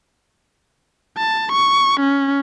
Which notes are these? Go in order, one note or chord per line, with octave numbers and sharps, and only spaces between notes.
A5
C#6
C#4